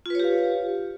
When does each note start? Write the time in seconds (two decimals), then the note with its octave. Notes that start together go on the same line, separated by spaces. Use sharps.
0.06 F4
0.10 B4
0.15 C#5
0.20 G4
0.24 F5